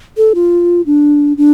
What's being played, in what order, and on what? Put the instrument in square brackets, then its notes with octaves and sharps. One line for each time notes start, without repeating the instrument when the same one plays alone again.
[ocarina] A4
F4
D4
D4